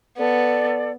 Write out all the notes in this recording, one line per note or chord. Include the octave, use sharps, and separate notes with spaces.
B3 A4 D5